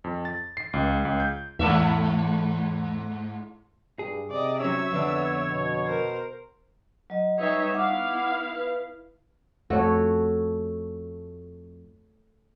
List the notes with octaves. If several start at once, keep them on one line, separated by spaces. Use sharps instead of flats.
F2
A6
C7
C#2
C#2
G6
E2 G#2 A3 E5
G2 G#4
C3 D5 D#5
F#3 C#4 C#5 E5 E6
F2 D3 B3 D4
B2
A#4 C5
F#3 D#5
G3 D#4 B4 C#5 E5
B3 E4 F5 F#5 D6
B4
F2 A3 F#4 A4 C#5